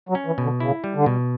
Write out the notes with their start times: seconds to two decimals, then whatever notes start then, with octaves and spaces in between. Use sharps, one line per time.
0.09 F#3
0.15 C#4
0.26 E3
0.38 B2
0.44 D3
0.60 C#3 E4
0.84 G3
0.95 D3
1.06 B2